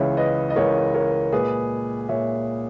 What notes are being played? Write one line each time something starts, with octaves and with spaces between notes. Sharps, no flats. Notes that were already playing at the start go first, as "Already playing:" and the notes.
Already playing: C#2 C#3 E3 C#5 E5
B4 D#5
D#5
C#2 C#3 E3 A#4 C#5
A#4 C#5
A#2 G#3 G#4 B4
A#2 C#5 E5